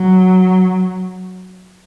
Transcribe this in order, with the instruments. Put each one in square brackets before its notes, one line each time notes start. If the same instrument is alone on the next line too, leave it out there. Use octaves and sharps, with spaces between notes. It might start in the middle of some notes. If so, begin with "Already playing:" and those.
Already playing: [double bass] F#3